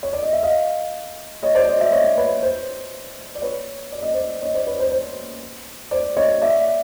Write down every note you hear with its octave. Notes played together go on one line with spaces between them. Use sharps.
C#5
D5
D#5
E5
D#5 F5
C#5 D#5
C5 D5
C#5 D#5
D5 E5
C#5 D#5
B4 C#5
C5
D5
B4 C#5
D5
D#5
C5 D5
C#5 D#5
C5 D5
B4 C#5
C5
C5
C5 D5
C#5 D#5
D5 E5